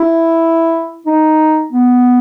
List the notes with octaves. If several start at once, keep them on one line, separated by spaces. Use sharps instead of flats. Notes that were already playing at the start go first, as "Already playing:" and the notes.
Already playing: E4
D#4
B3